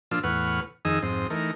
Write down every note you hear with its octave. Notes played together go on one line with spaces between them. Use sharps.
A#2 F3 D4 F4 E6
E2 A2 B4 F#5 C#6 F6
F2 D#3 D#4 G#4 D#6 E6
F2 G#2 C4 D#6
E3 A3 D#4 A#4